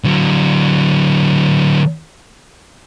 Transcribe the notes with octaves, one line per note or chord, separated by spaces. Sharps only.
D3 F#3